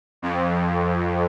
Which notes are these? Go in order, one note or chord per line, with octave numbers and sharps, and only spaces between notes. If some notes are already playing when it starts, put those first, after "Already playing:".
F2